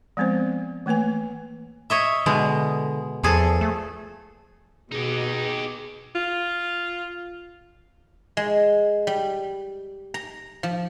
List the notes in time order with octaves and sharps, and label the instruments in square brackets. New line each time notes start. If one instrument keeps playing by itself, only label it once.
[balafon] F3 G#3 B3 C4 C5
E3 A3 A#3 B4 G#5
[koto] C#5 D#5 E5
[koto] B2 G#3 [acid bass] D3
[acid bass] E2 [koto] F3 G#4 A4
[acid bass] A3
[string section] B2 [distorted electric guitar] D#4 G4 [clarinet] G#4
[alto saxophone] F4
[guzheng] G#3
G3
A#5
F3